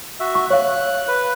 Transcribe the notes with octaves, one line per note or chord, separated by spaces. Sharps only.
F#4 E5
C#6
C#5 F5 F#6
B4